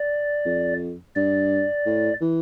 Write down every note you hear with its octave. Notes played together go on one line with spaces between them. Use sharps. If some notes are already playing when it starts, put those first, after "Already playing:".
Already playing: D5
F2
G2 D5
A2
E3